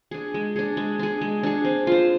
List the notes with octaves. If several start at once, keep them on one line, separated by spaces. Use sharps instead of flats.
D4 G#4
G#3
D4 G#4
G#3
D4 G#4
G#3
D4 G#4
C4
F4 C5